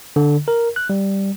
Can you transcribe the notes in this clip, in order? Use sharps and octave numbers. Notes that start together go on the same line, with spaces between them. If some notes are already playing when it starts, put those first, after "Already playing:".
D3
A#4
F#6
G3